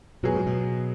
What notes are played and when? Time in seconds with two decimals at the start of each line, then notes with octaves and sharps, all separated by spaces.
0.23 B2 F#3 B3 G#4
0.34 G#2
0.46 B2